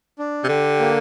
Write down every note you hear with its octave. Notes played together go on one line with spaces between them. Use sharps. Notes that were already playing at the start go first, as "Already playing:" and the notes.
D4
C3
D3 G4
A#3